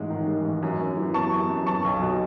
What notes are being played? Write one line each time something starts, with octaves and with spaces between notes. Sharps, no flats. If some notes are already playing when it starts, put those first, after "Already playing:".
Already playing: A1 G#2 G#3
D#3
G#3
A1
F#2
F#2
E3
B3 A5 C#6
F#2
F#2
B3 A5 C#6
B1
B2